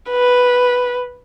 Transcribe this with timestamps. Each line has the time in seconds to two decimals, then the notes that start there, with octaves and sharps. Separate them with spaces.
0.10 B4